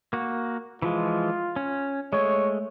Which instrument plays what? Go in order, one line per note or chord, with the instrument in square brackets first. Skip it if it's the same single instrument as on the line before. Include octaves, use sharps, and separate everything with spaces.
[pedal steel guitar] A#3 F#4
[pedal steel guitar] E3 F3 G#3 [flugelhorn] F4
[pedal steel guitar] C#4
[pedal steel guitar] G#3 A3 [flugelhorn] C#5